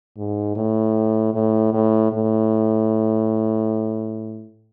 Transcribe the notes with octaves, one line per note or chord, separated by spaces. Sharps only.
G#2
A2
A2
A2
A2